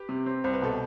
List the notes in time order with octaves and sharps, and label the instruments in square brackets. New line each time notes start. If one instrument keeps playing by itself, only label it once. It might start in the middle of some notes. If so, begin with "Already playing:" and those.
Already playing: [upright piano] G4 B4
[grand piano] C3
C4
[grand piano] C2 [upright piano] C5
[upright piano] B4
[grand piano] B2 [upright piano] A4